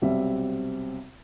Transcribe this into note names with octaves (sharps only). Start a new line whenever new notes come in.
B1 C3 G3 C4 E5